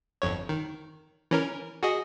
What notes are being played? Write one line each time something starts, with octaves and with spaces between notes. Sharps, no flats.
G1 F2 C#5
D#3
E3 C#4 A#4
F#4 G#4 D#5